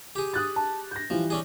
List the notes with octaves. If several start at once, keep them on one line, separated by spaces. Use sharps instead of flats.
G4 G#4
D#6 F#6 A6
A5
G6 A#6
E3 F3 G3
C#4 D4 G#4